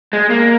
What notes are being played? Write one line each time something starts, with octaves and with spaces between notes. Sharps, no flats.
G#3
A#3